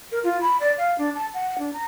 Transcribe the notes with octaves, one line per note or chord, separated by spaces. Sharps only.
A#4
F4
B5
D5
F5
D4
A5
F#5
D4
A#5